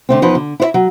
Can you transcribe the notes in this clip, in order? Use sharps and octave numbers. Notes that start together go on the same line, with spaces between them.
D3 A3 C4
E2 F3 D#4 B4
D3
E4 C5 E5
F#3